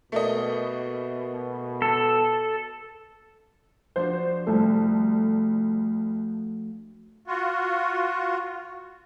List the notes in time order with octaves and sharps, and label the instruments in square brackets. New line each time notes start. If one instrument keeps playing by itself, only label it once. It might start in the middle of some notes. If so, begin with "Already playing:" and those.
[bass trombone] B2 [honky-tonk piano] A3 A#3 D#5
[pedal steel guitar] A4
[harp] F3 D4 F#4 [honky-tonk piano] C5
[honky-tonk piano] C2 A4 [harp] A3
[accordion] F4 F#4